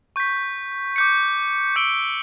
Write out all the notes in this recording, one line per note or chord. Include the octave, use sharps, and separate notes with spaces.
C#6 G6 B6
D6 G6 C#7
E6 G6 D7 G7